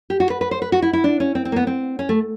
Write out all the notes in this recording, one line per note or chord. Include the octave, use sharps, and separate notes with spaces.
G4
F#4
B4
B4
C5
B4
F#4
E4
E4
D4
C#4
C4
C4
A#3
B3
C4
C#4
A3